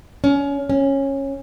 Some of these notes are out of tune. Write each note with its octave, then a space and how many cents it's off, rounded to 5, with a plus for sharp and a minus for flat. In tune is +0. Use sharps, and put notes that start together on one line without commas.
C#4 +25
C#4 -15